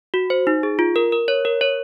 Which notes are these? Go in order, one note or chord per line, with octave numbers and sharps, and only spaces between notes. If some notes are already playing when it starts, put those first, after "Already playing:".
F#4
C5
D#4
G#4
F4
A#4
A#4
C#5
A#4
C#5